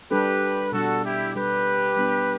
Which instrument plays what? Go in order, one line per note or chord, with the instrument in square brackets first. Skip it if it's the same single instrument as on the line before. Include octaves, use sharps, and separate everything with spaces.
[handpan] G3 D4 A4 [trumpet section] G4 B4
[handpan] B2 G3 D4 [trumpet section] F#4 A4
[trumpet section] E4 G4
[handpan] G3 D4 A4 [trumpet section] G4 B4
[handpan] G3 B3 D4